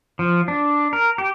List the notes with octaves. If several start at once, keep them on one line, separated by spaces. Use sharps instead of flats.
F3
D4
A#4
G4